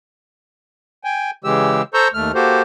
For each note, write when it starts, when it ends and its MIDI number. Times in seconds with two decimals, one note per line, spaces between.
1.04 1.31 79
1.04 1.31 80
1.44 1.82 49
1.44 1.82 52
1.44 1.82 56
1.44 1.82 67
1.44 1.82 88
1.94 2.08 69
1.94 2.08 72
1.94 2.08 82
1.94 2.08 85
1.94 2.08 88
1.94 2.08 91
2.14 2.32 39
2.14 2.32 57
2.14 2.32 89
2.35 2.62 58
2.35 2.62 66
2.35 2.62 67
2.35 2.62 69
2.35 2.62 72